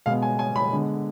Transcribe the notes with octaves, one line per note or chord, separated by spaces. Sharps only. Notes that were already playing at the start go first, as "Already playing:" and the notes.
B2 G#3 B3 F5
G#5
G#5
B5
D3 G#3 B3